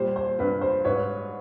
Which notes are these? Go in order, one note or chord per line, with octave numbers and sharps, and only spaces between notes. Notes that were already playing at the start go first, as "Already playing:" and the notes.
Already playing: A#2 G3 C5
C5
G2 B4
C5
G#2 B4 C#5